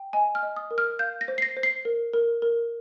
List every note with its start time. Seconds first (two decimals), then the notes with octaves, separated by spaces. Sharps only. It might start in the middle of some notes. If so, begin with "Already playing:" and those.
Already playing: G5
0.13 D#5 G#5
0.35 F6
0.43 D#5
0.56 D#6
0.71 A#4
0.78 F6
0.99 F5 G6
1.21 A#6
1.28 C5
1.38 C7
1.42 A#6
1.57 C5
1.63 C7
1.85 A#4
2.13 A#4
2.42 A#4